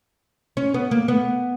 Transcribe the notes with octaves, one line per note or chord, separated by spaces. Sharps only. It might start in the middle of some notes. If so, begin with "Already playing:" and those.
C#4
B3
A#3
B3